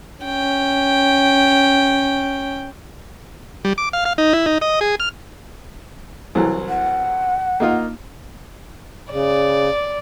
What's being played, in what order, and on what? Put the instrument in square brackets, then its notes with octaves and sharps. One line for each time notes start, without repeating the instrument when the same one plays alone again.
[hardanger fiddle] C#4 G5
[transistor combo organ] G3
D6
F5
F5
D#4
E4
D#4
D#5
G#4
F6
[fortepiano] C2 E3 F#3
[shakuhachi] F#5
[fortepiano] A#3 D#4 F4
[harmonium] C#3 [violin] D5